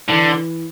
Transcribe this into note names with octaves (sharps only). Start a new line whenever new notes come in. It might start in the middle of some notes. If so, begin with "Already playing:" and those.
D3 E3